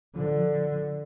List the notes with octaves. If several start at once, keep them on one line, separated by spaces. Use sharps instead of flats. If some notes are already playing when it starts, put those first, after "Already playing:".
D3 F3